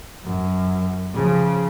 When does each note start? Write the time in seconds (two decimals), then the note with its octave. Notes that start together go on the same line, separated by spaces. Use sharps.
0.24 F#2
1.13 C#3 F3